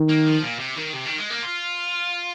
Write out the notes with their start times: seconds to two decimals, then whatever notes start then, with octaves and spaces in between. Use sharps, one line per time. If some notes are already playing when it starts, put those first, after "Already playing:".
Already playing: D#3
0.09 A#3
0.26 F3
0.42 A#2
0.59 C3
0.76 D#3
0.93 C3
1.05 D#3
1.18 G#3
1.30 A#3
1.43 F4